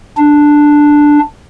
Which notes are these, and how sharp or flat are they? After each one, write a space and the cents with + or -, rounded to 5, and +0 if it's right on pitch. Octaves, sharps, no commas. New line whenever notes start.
D4 +5